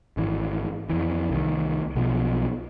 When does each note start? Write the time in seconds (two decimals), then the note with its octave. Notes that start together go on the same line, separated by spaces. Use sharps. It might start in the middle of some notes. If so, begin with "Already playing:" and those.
0.17 G#1 E3
0.90 F2 E3
1.30 C2 D#3
1.96 B1 B2 F3